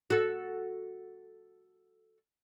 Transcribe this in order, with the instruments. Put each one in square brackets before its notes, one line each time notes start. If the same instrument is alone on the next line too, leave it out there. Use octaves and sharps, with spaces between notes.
[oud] F#4 A4